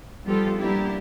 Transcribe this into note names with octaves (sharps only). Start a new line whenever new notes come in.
F3 G3 B3 F4 G4 A4
G3 A#3 B3 D4 E4 G4